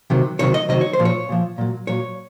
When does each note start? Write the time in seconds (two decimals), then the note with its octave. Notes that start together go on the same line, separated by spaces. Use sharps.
0.10 C3 D#3 F#3
0.39 C3 D#3 F#3 C#5
0.54 D#5
0.69 C3 D#3 F#3 D#5
0.81 C#5
0.93 C5
0.99 A#2 F3
1.05 C#5
1.29 A#2 F3
1.58 A#2 F#3
1.87 A#2 F#3 C#5